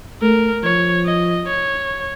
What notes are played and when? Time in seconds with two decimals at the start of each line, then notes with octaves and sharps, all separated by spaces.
0.22 A3 A#4
0.64 F3 C#5
1.05 D#5
1.47 C#5